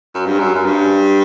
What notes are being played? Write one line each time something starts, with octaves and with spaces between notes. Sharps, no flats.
F#2
G2
F#2
F#2
G2